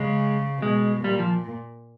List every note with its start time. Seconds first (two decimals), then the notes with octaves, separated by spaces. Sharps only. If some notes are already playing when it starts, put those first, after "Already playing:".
Already playing: C#3 G#3
0.62 B2 G#3
1.04 A#2 G3
1.19 F3